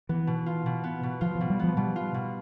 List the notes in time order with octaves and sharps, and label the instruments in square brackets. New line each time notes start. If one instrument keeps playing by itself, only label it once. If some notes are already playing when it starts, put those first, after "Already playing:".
[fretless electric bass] E3 [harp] B3
[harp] B2
F4
B2
B3
B2
[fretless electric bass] F3 [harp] F4
[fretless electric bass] F3
[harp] B2
[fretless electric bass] G3
[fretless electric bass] F3 [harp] B3
[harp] B2 [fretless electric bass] G3
[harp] F4
B2